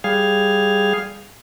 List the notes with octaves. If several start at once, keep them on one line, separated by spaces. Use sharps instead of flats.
G3 G#4 F5